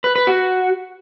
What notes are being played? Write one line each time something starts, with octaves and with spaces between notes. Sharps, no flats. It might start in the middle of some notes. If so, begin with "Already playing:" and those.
B4
B4
F#4